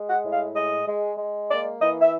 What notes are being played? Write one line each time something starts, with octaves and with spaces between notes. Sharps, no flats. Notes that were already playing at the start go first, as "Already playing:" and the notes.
Already playing: G#3
F#5
A2
F5
G#3 D#5
G#3
G#3
A#3 D5
E3 D#5
E5